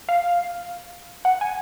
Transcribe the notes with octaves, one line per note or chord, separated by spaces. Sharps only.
F5
F#5
G#5